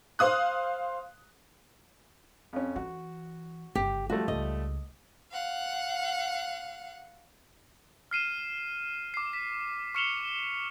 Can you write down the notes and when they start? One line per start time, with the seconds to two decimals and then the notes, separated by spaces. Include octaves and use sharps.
0.19 C5 F5 D#6 F#6
2.53 F2 C#4
2.76 E3 F#4
3.75 G1 C#3 G4
4.10 F3 G3 A3 F#4
4.28 C#2 D#5
5.32 F5 F#5
8.11 F6 C7 D#7 E7
9.14 D6 C7
9.33 B6
9.95 C#6 F6 C#7 E7 F7 G7